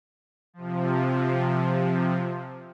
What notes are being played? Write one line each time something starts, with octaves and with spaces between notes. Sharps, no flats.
C3 F3